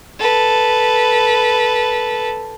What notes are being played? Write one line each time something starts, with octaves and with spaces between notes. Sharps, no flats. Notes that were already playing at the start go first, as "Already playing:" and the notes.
A4 B4